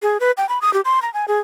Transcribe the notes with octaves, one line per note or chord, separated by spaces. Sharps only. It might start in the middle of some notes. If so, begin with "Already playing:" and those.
G#4
B4
G5
B5
D#6
G4
C6
A#5
G#5
G#4